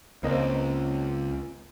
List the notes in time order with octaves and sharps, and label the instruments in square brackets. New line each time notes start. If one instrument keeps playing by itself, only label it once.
[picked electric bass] C#2 [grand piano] A#3 C4 D#5